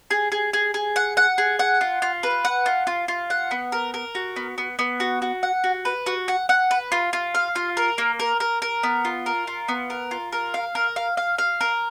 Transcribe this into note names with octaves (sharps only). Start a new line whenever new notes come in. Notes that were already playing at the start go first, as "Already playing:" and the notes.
G#4
G#4
G#4
G#4
F#5
F#5
G#4
F#5
F4
F4
B4
F#5
F4
F4
F4
F#5
B3
A#4
A#4
F#4
B3
B3
B3
F#4
F#4
F#5
F#4
B4
F#4
F#5
F#5
B4
F4
F4
F5
F4
A#4
A#3
A#4
A#4
A#4
B3
F4
A#4
F4
B3
A#4
F4
A#4
F5
A#4
F5
F5
F5
A#4